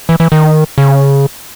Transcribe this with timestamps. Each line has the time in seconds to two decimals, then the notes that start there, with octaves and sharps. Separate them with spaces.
0.09 E3
0.20 E3
0.32 D#3
0.78 C#3